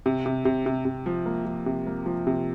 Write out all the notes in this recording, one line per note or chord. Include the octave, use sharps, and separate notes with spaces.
C3
C3
C3
C3
C3
F3
A#3
F3
C3
A#3
F3
C3